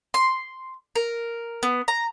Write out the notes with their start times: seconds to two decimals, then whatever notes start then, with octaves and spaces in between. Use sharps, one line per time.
0.14 C6
0.96 A#4
1.63 B3
1.88 A#5